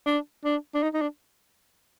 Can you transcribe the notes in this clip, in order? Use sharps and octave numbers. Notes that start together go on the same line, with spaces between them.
D4
D4
D4
D#4
D#4
D4